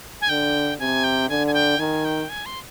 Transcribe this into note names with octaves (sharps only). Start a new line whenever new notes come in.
G#5
D3 G5
C3 G#5
G5
D3 G#5
G#5
G5
D#3 G#5
G5
G#5
C6